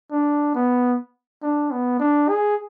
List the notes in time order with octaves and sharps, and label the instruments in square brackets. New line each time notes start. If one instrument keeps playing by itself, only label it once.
[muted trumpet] D4
B3
D4
B3
D4
G#4